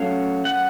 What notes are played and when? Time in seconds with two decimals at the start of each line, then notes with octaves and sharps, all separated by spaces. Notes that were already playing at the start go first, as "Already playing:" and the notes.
Already playing: F#3 A3 C#4 F5
0.45 F#5